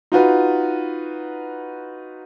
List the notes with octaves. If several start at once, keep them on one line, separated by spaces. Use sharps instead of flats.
D#4 F4 F#4 B4